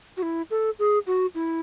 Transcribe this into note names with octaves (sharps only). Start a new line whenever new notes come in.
F#4
E4
A4
G#4
F#4
E4